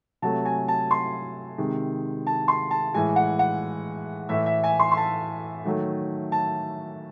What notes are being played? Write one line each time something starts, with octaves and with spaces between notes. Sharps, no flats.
C3 F#3 A3 A5
G#5
A5
C6
C3 D#3 G#3
A5
C6
A5
A2 E3 G#3 G#5
F#5
F#5
A2 E3 A3 E5
E5
G#5
C6
C6
A5
D#3 F#3 A3
A5